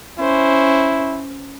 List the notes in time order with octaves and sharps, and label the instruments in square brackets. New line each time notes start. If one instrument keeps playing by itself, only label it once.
[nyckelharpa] C#4 C5 [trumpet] E4